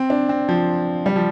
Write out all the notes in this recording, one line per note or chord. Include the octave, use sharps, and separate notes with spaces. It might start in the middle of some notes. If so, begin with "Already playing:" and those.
Already playing: C4
D4
C4
F3
G3
F3